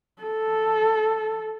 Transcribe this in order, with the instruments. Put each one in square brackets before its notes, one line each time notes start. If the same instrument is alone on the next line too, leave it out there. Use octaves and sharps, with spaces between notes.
[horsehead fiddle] A4